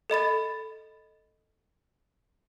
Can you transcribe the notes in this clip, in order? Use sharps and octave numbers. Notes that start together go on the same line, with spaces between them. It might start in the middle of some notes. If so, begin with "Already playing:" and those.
A4 D#5 B5 A6